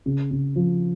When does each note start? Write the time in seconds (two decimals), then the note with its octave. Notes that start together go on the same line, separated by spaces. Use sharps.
0.06 C#3
0.31 C#3
0.56 F3